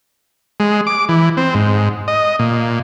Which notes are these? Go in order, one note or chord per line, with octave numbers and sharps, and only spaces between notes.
G#3
D6
E3
C4
G#2
D#5
A#2